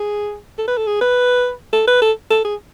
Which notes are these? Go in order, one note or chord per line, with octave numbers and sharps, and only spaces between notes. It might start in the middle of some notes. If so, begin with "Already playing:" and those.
Already playing: G#4
A4
B4
A4
G#4
B4
A4
B4
A4
A4
G#4